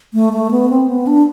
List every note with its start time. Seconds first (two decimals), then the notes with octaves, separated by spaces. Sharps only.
0.14 A3
0.33 A3
0.51 B3
0.69 C4
0.88 B3
1.07 D4